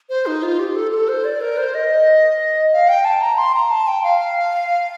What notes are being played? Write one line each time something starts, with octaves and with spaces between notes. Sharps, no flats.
C5
D#4
F4
G4
A4
A4
C5
D5
A#4
C5
D#5
F5
G5
A5
A#5
C6
A#5
A5
G5
F5